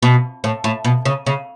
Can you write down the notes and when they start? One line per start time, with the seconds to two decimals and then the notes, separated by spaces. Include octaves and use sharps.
0.02 B2
0.44 A2
0.64 A2
0.85 B2
1.05 C#3
1.26 C#3